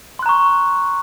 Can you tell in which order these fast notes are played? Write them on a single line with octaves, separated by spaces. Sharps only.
C6 F#6 A#5 C#6